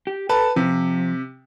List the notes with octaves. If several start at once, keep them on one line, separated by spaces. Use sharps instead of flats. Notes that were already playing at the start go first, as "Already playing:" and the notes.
G4
A4 B4 A5
C3 F3